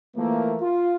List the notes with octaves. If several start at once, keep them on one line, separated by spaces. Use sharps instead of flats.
E3 F3 A3 A#3
F4